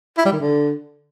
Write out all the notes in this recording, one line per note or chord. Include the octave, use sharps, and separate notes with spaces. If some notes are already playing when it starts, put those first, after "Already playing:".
E4
G3
D#3
D3